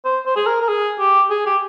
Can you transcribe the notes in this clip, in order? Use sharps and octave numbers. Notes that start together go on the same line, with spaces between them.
C5
C5
G#4
A#4
A#4
G#4
G4
G#4
G4